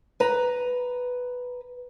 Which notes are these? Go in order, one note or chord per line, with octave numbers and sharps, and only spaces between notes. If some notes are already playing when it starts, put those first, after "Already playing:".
B4 A#5